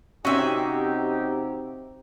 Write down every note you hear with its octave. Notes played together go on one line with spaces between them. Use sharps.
C3 C4 C#4 D#4 F#4 G4 E5